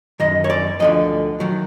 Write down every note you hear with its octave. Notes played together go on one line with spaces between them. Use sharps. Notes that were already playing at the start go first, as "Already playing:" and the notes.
F#2 D#3 D#5
C#5
D5
D2 D3 F3 D#5
D#3 F#3